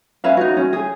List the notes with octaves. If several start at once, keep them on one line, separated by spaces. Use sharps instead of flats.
C#4 B4 E5 F5
D#4 F#4
C#4
G#4